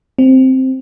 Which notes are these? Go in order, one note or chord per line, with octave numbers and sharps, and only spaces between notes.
C4